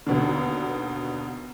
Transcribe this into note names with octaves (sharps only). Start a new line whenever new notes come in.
D#2 B2 D3